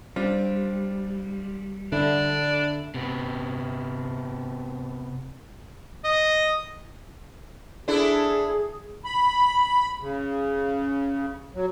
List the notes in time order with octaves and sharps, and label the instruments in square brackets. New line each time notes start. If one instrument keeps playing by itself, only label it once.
[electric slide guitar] G3 [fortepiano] C4 D4 F4
[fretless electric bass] D3 [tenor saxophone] D4 [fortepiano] E4
[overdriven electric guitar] C3 B3
[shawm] D#5
[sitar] D4 E4 A4 [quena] G#4
[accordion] B5
C#3
F#3